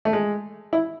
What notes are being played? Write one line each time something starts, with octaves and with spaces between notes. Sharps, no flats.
A3
G#3
E4